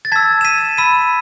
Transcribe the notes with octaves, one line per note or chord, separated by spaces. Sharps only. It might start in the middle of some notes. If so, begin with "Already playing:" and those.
A6
A5 E6 G#6 B6
E7
B6 D#7
B5 E6 B6 D#7